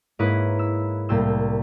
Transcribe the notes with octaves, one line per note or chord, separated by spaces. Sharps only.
G#2 A#3 E4 B4 C#5 D#6
E6
C2 A2 A3 A#3 C6 E6